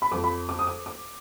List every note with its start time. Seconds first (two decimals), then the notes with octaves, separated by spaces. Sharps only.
0.02 B5
0.11 F2 F3 D6
0.24 B5
0.49 D6
0.59 D#6
0.67 D6
0.86 D6